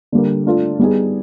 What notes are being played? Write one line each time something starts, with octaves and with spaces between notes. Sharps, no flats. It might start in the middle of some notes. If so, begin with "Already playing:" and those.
D3 G3 A#3
A3 D4 F4 A4
G3 B3 D#4 G#4